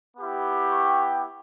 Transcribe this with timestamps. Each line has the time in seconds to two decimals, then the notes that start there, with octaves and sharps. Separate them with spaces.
0.17 B3 E4 G4
0.70 C#6